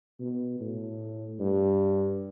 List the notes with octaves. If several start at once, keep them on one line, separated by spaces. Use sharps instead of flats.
B2
A2
G2